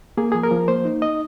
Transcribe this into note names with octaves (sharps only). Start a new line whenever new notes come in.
A#3 G#4
F3 G#4
A#4
F3
A#3 C5
D#4
D#5